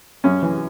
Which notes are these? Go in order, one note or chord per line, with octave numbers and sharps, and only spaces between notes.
F#2 C#4
E3